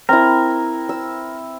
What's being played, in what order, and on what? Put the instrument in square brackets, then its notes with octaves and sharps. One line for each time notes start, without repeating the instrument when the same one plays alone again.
[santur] C4 E4 [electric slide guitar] A#4
[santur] E6